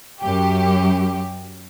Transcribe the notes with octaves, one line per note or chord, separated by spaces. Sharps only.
F#2 G4